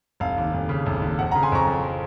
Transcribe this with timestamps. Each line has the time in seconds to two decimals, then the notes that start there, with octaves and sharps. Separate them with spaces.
0.20 F1 F5
0.37 D#2
0.54 F1
0.69 C#3
0.86 F1
1.02 D#2
1.19 F2 F#5
1.31 C#3 F#5 A#5
1.43 G#5 C6
1.52 F2 A#5 C#6
1.67 F3